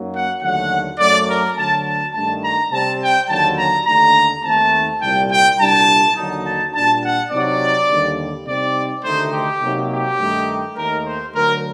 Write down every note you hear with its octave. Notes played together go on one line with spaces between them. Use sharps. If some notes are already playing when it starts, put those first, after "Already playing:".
Already playing: F#2 F#3 A#3 D#4
F#5
D#2 D3 F#3 A3 F#5
F#2 F#3 A3 D5
A#4
D2 D3 F#3 A5
A5
G2 D#3 A3 D4 A5
A#5
C3 G3 C4 A5
G5
D#2 D3 F#3 A5
A#5
D#2 D3 A3 D4 A#5
D#2 D#3 A3 C4 A5
C2 A#2 G3 C4 G5
G5
C2 A#2 G3 D4 A5
D#2 D3 F#3 A#3 D#4
A5
A#2 G3 D4 A5
F#5
C3 F#3 C4 D#4 D5
D#2 D3 G3
C3 G3 C4 D#4 D5
D2 C3 D#3 A3 D#4 C5
G4
C3 F#3 A#3 D#4
G4
G2 D#3 A3 D#4
D#2 D#3 A3 D#4 A#4
C5
D2 D3 F#3 A#4